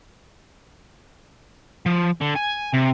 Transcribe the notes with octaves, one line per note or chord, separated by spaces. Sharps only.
F3
D3
G#5
C3